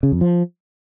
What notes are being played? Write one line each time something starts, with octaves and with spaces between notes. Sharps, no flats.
C#3
F2
F3